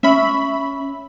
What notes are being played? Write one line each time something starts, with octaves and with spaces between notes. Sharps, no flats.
C#4 E5 B5